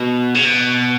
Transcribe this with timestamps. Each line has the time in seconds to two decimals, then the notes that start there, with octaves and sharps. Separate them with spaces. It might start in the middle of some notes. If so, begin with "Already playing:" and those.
Already playing: B2
0.35 C#3
0.45 B2